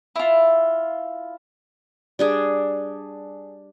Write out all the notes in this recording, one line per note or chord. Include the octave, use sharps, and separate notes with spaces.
E4 F4
G3 D4 G#4